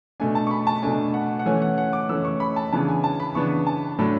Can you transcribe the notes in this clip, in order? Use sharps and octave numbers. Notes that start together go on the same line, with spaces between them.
B2 A3 D4 G#5
A5
C#6
B5
A5
B2 A3 D4 G#5
F#5
F#5
E3 A3 C#4 G#5
F#5
F#5
D6
E3 A3 C#4 E6
C#6
B5
A5
C#3 E3 B3 D4 A5
G#5
A5
B5
C#3 E3 B3 D4 C#6
A5
A2 F#3 A3 D4